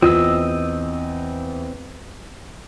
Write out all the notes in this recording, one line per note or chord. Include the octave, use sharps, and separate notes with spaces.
E2 C4 F4 D#5 E6